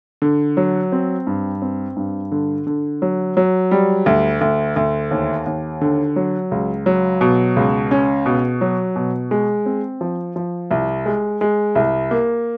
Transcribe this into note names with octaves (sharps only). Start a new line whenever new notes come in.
D3
F#3
C4
G2
C4
G2
D3
D3
F#3
F#3
G3
D2
D2
D2
D#2
D#2
D3
F#3
C#2
F#3
B2
C#2
C#4
B2
F#3
B2
G#3
C4
F3
F3
C2
G#3
G#3
C2
A#3